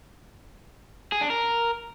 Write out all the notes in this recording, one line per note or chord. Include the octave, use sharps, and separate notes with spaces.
G#4
D4
A#4